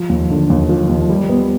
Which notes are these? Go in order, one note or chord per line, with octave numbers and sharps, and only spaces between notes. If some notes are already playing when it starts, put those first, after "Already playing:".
Already playing: F3
D#2
D3
D#2
F3
D#2
G3
B3